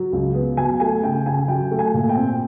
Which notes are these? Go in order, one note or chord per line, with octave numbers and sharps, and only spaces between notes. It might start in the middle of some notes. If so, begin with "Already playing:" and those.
Already playing: F#3
C#2
B3
F#3 G#5
A3 G#5
C#3 G5
C#3 G#5
F#3 G5
A3
G#5
A#2
G5
C4